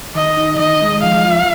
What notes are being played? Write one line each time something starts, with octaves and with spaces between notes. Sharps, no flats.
D#3 D#5
D#4
D#3 D#5
G#3
F3 F5
F4